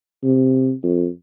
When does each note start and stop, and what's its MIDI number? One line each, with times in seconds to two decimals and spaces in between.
0.24 0.72 48
0.83 1.08 41